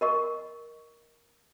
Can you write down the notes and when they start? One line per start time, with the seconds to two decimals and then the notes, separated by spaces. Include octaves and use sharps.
0.01 A#4 D#5 C#6